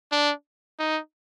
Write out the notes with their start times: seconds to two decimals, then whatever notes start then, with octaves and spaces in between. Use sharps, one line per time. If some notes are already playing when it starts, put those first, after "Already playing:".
0.12 D4
0.79 D#4